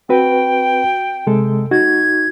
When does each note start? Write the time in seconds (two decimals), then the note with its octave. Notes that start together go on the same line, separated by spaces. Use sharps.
0.09 C4 F#4 B4 G5
1.27 C3 G#3 A4
1.71 D#4 F#4 G#6